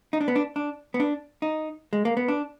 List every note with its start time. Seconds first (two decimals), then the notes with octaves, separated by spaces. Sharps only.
0.13 D#4
0.21 D4
0.28 B3
0.36 D4
0.56 D4
0.94 B3
1.00 D4
1.42 D#4
1.93 G#3
2.05 A#3
2.17 B3
2.28 D4